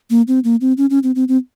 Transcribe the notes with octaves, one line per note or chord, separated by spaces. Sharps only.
A#3
C4
A#3
C4
C#4
C#4
C4
C4
C4